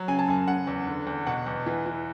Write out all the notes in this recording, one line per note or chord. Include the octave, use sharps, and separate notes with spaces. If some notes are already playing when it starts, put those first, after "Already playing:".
Already playing: F#3
C#3 G#5
A5
F#2 G#5
C#3 F#5
E2
D3
E2
B2 F#5
E2
E3
E3